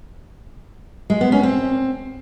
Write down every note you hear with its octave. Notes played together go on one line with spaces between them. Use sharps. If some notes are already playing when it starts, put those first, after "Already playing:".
G#3
B3
C#4
C4